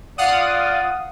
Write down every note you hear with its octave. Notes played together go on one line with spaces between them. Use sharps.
F4 D5 F5 F#5 D#6